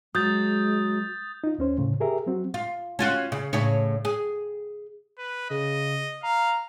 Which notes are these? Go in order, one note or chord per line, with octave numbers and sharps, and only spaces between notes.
F#3 G#3 D#6 G6 A6
D#4 F4
D#2 C#4 C5
A2 C#3
G4 G#4 A#4 E5
F#3 C4 F#4
F4
C#4 F4 F#4
C#3
A2 C#3 C#5
G#4
B4
C#3 D#5
F5 A#5